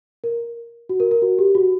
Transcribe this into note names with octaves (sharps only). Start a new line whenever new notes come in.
A#4
F#4
A#4
A#4
F#4
G4
F#4